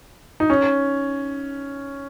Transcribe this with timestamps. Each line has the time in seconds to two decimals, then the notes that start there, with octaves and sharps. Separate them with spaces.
0.40 D#4
0.50 C#4